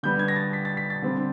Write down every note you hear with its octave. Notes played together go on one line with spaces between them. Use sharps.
D3 G3 B3 G6
G#6
A#6
A6
B6
A6
B6
A6
D3 G3 C4